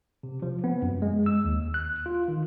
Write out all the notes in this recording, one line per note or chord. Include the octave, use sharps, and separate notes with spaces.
C3
F3
B3
F#2
G#3
E6
D#2
F#6
F4
D#3